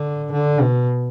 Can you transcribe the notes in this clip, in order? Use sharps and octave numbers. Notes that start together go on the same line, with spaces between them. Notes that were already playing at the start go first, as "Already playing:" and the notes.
Already playing: D3
D3
B2